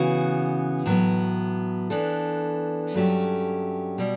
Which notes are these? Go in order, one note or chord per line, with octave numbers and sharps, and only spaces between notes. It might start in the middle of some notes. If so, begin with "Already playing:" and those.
Already playing: C#3 E3 B3 F#4
A2 F#3 B3
E3 B3 D4 A4
G2 F#3 A3 C#4 G4
B2 G3